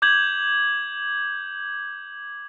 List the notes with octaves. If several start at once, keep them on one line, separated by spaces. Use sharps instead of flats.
D6 G6 G#6 F#7